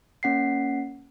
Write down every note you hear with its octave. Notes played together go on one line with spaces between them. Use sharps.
A#3 C#4 F#5 B6 C7